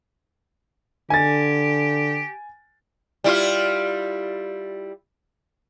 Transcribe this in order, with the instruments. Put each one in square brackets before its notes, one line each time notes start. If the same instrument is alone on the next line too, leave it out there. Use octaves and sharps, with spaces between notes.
[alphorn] D3 [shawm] G4 [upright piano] G#5 A6
[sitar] G3 E4 F4